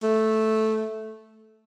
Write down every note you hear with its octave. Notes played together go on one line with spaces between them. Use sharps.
A3